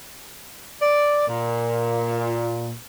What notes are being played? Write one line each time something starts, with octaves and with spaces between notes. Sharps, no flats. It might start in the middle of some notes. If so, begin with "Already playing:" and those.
D5
A#2